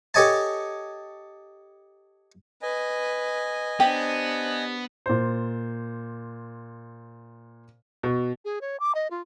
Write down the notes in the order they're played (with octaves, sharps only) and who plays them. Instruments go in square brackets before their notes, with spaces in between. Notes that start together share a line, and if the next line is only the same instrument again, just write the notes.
[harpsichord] G4 A4 C#5 D#5 G#5 A5
[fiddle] B4 [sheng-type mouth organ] D#5 G#5
[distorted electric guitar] B3 [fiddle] D4 C5 [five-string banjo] G4
[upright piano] A#2 C5
[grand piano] B2
[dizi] G#4
C#5
D6
D#5
F4